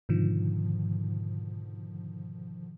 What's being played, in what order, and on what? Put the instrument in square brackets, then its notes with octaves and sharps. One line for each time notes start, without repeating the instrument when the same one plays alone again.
[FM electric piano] G#2 B2 D3 D#3 F3